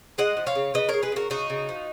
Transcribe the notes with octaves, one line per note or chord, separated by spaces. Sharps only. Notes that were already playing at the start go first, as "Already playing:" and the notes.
G#3 D#5 F#5
F3
C#5 F5
C#3
C#3 B4 D#5
G#3 A#4 C#5
G#4 B4
C#3 F#4 A#4
C#3 D#4 F#4
C#3
F3